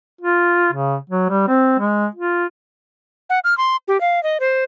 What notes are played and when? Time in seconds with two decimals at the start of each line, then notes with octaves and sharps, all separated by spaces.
0.21 F4
0.72 C#3
1.10 F#3
1.29 G3
1.48 C4
1.79 G#3
2.15 F4
3.30 F#5
3.44 F6
3.58 C6
3.88 G4
4.01 F5
4.23 D#5
4.40 C5